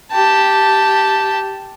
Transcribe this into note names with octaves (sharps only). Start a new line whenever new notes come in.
G4 A5